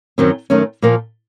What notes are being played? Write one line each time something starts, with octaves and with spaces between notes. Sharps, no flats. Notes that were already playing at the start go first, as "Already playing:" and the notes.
F#2 D#3 F#3 C4
F#2 D#3 A3 C#4
A#2 F3 A#3